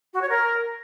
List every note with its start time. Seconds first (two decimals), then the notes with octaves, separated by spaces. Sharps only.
0.13 F#4
0.21 C#5
0.29 A#4